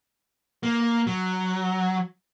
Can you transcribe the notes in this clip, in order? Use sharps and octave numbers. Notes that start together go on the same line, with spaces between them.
A#3
F#3